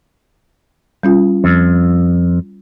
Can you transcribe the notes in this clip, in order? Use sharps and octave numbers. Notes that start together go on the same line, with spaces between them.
G3 C#4 F4
F2